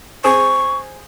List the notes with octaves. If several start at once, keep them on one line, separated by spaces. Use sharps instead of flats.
C4 G#4 C#6